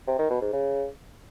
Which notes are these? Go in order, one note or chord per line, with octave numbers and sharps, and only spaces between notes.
C3
D#3
B2
G#2
C#3